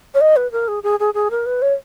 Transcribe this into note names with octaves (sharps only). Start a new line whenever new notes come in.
C#5
D#5
B4
A#4
G#4
G#4
G#4
G#4
A#4
B4
C#5